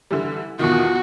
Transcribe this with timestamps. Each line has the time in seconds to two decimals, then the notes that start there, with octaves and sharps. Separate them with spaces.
0.11 D3 E3 G3
0.59 E2 B2 D#3 F4 F#4